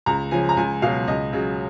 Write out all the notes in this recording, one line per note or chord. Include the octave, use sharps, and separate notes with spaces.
C#2 A#5
C#3 F3 G#5
A#5
C#2 G#5
B2 F#3 F5
C#2 D#5
C#3 F#3